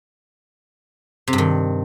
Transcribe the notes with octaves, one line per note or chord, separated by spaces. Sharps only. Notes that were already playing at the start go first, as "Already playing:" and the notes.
C3
G2
D#3